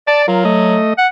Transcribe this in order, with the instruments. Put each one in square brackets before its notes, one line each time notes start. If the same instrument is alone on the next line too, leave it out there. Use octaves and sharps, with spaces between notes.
[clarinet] D5 [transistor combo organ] A5
[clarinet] F#3 [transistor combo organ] F4 A#4
[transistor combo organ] A3 D#5
[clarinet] F#5